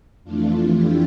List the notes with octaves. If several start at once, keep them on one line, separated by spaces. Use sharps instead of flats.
F2 E3 A3 D4 F4
E4 G4